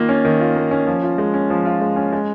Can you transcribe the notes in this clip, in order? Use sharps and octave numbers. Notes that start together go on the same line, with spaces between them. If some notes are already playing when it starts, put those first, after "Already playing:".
Already playing: D#3 A#3 F4
C#4
D#3
F4
A#3
C#4
F3
F4
G#3
C#4
F3
F4
G#3
C#4
G#3